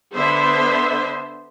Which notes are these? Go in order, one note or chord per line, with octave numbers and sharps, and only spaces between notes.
D3 B3 C5 E5